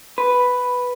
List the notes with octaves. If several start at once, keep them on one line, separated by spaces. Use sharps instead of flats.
B4